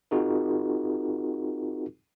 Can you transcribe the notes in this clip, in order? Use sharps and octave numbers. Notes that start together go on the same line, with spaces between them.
C4 D#4 F4 F#4 G#4 A#4